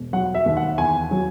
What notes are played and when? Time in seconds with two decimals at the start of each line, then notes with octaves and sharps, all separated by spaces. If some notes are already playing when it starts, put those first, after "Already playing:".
Already playing: E1
0.13 F#3 F#5
0.34 E5
0.46 D#2
0.57 F#5
0.78 E2 G#5
1.11 F#3